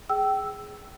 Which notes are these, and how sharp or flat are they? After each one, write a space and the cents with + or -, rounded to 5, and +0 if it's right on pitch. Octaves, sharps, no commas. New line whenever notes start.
G#4 +0 G5 -25 E6 +0